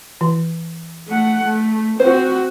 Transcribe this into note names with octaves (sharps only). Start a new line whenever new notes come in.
E3
A3 F#5
A3
C4 F#4 C5